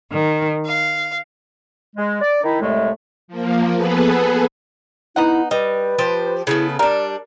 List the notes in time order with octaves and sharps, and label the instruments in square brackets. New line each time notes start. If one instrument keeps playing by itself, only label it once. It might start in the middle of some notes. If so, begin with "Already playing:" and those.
[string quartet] D#3
F5
[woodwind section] G#3
D5
D#3 D#4 E4
C2 A2 G#3 A3
[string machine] F3 A#3
B3 G#4 A4 B4
[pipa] B3 D#4 F#5 [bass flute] E4
[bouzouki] G3 [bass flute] B4 [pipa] D#5
[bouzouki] F3 G4 C5
[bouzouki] C#3 A3 B3 [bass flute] E4
[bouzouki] G3 D4 [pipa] A#4 [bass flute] D5